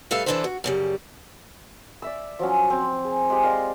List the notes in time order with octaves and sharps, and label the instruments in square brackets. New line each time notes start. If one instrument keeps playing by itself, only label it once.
[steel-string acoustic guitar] A2 G3 A4 B4 E5 F5
D3 E3 D4 A4 B4 C5
F#4
F#2 C#3 G3
[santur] D5 E5 E6
F3 F#3 C#4
C4
G#4
G#3 G4
D5 D#5 F5 C6